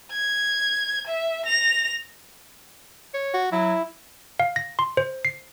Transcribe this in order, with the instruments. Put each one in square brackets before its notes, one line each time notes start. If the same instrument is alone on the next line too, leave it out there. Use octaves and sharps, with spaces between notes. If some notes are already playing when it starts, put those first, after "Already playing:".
[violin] G#6
E5
A#6 F7
[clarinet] C#5
[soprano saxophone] F#4
[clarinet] F#3 [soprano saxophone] E4
[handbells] F5
A#6
C6
C5
C7